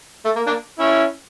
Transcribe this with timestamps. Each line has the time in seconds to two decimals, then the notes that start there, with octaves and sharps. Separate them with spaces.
0.25 A3
0.36 A#3
0.47 A#3 D4
0.79 C#4 E4